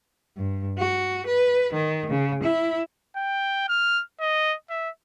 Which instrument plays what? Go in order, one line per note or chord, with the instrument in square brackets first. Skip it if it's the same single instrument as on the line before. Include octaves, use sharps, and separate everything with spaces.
[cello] G2
F#4
B4
D#3
C#3
E4
[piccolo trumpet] G5
F6
D#5
E5